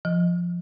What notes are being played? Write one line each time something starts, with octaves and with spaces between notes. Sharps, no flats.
F3